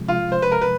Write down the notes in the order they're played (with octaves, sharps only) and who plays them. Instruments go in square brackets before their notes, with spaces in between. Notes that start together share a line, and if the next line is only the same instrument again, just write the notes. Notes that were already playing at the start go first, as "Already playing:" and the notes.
Already playing: [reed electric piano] C3 F3 G#3
[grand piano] F4
C5
B4
A#4
B4